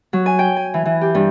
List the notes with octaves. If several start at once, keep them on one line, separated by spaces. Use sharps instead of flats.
F#3
G#5
G5
G#5
E3
E3
G4
G2